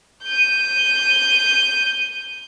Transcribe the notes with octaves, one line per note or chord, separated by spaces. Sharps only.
G6 D#7